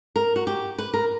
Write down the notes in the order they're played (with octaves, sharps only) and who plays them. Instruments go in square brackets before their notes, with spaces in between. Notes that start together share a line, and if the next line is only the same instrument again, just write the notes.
[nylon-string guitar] A#4
F#4
G4
B4
A#4